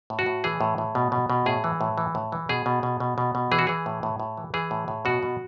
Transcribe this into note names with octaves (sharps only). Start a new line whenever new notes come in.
A2
F#4
A2
E3 G#4
A2
A2
B2
B2
B2
A2 G#4
E3
A2
E3
A2
E3
B2 G#4
B2
B2
B2
B2
B2
E3 G#4
F#4
E3 G#4
A2
A2
A2
E3
E3 G#4
A2
A2
B2 F#4
B2